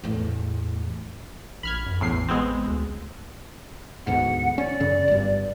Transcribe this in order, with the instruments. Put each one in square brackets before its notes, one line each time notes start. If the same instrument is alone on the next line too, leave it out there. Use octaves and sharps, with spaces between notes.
[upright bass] E2 A2
[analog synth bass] A#1 [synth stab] B5 F6 G#6
[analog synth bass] F#2
[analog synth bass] A1 [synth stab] E2 A2 C7
[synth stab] G#3 B3 C4
[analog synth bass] D2
[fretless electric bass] D2 G#2 B2 [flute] F#5
[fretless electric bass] C#4 [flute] D5
[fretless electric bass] F#2 C#3
G1 G2